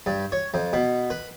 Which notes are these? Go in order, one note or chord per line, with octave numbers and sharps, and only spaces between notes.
G2
C#5
F2
B2
B4